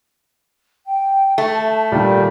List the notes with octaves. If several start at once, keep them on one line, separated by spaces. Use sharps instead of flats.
G5
A3 A5
A#2 D#3 G3